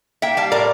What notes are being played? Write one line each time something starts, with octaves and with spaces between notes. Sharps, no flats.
A#3 E5 G5
G3 F5 A5
A2 A#4 D5